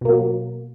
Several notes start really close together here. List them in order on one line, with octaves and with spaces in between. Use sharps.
B2 A#3 F#3